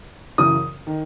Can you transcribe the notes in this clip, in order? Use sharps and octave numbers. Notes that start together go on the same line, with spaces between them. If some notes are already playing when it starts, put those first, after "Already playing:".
F#2 C#3 E3 D#6
D#3